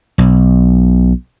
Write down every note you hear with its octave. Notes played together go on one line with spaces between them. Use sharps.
B1